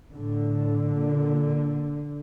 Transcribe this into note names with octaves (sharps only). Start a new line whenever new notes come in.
A2 D3
A#2